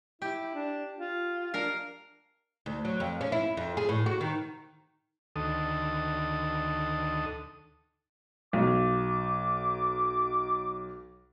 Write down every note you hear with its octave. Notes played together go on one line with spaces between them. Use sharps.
E4 G4
D4
F4
D4 A#4 F5
D2
F#3
F2
C#4
E4
F2
G#4
A2
F#4
D#3
D2 D#3 A4 D#6
B1 D6